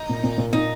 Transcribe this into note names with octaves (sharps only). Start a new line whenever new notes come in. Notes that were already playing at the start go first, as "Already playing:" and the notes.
Already playing: D#4
A#2
A#2
A#2
A#2 D#4